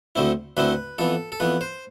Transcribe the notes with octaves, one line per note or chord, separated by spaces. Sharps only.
D2 D3 A3 C4 E4
D2 D3 A3 C4 E4 B4
F2 E3 B3 A4
A4
F2 E3 B3 B4
C5